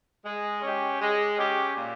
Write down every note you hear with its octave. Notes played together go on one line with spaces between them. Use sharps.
G#3
C#4 G4
G#3
C#4 G4
A#2